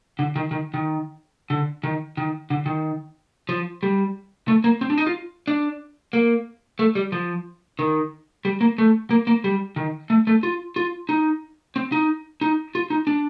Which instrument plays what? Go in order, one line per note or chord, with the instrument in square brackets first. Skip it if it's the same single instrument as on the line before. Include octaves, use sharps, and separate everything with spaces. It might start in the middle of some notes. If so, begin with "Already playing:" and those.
[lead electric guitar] D3
D#3
D#3
D#3
D3
D#3
D#3
D3
D#3
F3
G3
A3
A#3
C4
D4
D#4
F4
D4
A#3
A3
G3
F3
D#3
G3
A#3
A3
A#3
A#3
G3
D#3
A3
A3
F4
F4
D#4
C4
D#4
D#4
F4
D#4
D4